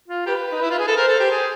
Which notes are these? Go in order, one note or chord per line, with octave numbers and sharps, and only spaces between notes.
F4
G4 B4
D#4
E4
F4
G#4
A4
A#4 C5
A4
G4
G#4